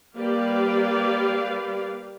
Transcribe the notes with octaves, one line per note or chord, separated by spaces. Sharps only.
G3 A#3 G4 B4 D5 F5